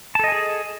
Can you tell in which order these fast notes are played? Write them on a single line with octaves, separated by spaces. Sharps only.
A5 A4 D#5 G#5 G#4